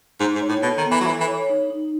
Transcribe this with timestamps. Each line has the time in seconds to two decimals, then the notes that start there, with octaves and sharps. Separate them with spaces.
0.20 G#2 D#4
0.35 G#2
0.42 C#5
0.49 A2
0.62 B2 A4
0.77 D#3
0.85 B3
0.91 E3
1.00 F#3
1.06 E3 A4
1.20 E3
1.27 C#5
1.49 D#4
1.70 D#4